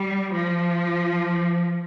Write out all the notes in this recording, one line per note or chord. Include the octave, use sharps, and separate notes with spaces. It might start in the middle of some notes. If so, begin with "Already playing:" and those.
Already playing: G3
F3